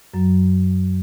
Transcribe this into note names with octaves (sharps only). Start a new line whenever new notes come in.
F#2 F#3